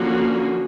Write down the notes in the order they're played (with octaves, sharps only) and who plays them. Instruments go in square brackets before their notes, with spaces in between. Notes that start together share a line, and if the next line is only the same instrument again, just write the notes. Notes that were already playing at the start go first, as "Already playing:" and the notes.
Already playing: [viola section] D3 F3 A#3 C#4 F#4